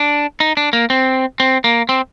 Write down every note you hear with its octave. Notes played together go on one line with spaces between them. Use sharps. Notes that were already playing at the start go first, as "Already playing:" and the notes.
Already playing: D4
D#4
D4
A#3
C4
C4
A#3
C4